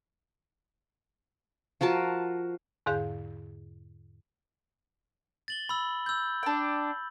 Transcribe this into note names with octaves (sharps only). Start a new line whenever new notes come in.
F3 F#4 A#4 A5
E2 G#2 D3 G#4 F5 G6
A6 F#7 G7
B5 E6
E6 G6
D4 G5